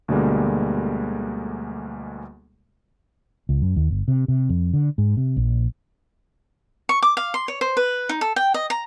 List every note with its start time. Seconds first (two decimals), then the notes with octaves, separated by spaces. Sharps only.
0.08 D2 B2 D3 G3 G#3 A#3
3.49 C#2
3.62 F#2
3.76 D#2
3.91 G1
4.08 C3
4.28 C3
4.49 F2
4.73 D3
4.98 G#2
5.17 C3
5.37 A#1
6.89 C#6
7.03 D6
7.17 F5
7.34 C6
7.48 C#5
7.61 C5
7.77 B4
8.09 D#4
8.21 A4
8.36 G5
8.54 D#5
8.70 A#5